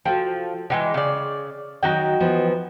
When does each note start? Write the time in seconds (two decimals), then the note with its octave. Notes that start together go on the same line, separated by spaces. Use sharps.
0.05 F3 F#4 A4 G5
0.70 D3 E3 G#3 G5
0.94 C#3 D5
1.83 D#3 F#3 D#4 F#4 G5
2.20 E3 F3 B3